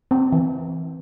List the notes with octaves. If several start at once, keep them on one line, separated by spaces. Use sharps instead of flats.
C4
E3